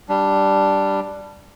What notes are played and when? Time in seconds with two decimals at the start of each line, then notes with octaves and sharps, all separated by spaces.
0.09 G3 D4